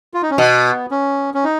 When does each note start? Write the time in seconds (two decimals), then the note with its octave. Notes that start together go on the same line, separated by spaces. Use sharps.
0.14 F4
0.23 D#4
0.30 C#4
0.38 B2 B3
0.91 C#4
1.34 C#4
1.44 D#4